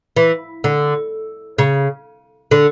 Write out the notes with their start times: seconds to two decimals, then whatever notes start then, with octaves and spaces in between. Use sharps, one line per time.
0.17 E3
0.64 D3
1.58 C#3
2.51 D3